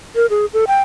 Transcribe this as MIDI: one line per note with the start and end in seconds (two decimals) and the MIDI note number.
0.15 0.26 70
0.30 0.46 68
0.54 0.65 69
0.67 0.82 79